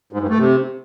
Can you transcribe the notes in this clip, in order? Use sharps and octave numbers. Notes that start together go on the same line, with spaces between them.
G#2
G2
A3
C3